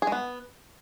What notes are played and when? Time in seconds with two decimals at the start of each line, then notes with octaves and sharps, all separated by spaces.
0.02 G#4
0.07 G#3
0.12 B3